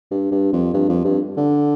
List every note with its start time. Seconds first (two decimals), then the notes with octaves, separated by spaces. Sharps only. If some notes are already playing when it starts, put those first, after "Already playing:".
0.11 G2
0.32 G2
0.53 F2
0.74 G2
0.89 F2
1.05 G2
1.37 D3